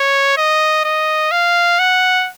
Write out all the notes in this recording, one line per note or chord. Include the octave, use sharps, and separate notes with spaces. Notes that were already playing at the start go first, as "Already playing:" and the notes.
Already playing: C#5
D#5
D#5
F5
F#5